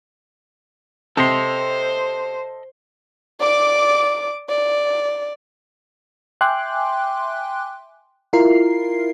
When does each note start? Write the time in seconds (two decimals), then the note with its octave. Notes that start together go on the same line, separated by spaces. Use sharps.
1.17 C3 A4 C5 D#5 C6
3.40 D5 D6
4.49 D5
6.41 E5 G5 G#5 C6 D6 F#6
8.33 E4 F4 A#4 C7